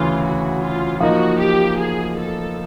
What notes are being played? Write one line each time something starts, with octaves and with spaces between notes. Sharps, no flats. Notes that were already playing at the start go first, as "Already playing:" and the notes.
Already playing: D2 C#3 E3 F4
F#4
F4
F3 A#3 D#4 F#4
G4
G#4
A4